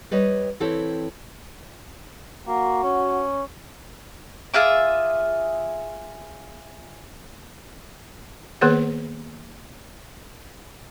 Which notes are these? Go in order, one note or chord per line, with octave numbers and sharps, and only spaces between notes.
G3 B4 C#5 D#5
E3 C4 E4 A4 C5 C#5
A#3 F#4
C#4
F4 G#4 E5 D6
D#3 A#3 B3 G#4 B4 C#5